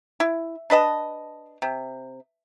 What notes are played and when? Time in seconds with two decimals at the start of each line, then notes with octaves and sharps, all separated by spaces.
0.20 E4
0.70 D4 B4 D#5 A5
1.62 C3